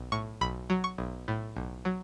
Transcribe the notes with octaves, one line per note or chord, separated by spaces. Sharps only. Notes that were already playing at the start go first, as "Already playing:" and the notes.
Already playing: B1
A2 C#6
B1 B5
F#3
C#6
B1
A2
B1
F#3